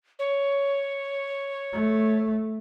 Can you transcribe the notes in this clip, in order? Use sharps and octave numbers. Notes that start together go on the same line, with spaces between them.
C#5
A3